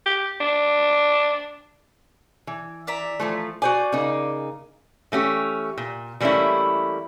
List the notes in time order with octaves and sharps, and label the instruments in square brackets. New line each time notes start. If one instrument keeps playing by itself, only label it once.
[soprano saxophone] G4
D4
[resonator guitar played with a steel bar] E3
[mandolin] D5 E5 A#5
[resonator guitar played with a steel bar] E3 F3 A3
[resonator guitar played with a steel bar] F#4 C5 G#5 [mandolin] D5
[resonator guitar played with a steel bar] C#3 A#3 D#4
E3 A3 C#4 G4
A#2
E3 G3 A3 A#3 C#4 E4